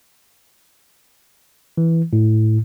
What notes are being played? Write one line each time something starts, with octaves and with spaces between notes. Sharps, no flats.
E3
A2